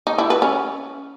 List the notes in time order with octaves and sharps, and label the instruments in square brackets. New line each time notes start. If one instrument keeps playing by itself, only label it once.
[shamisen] D#4
E4
B4
C#4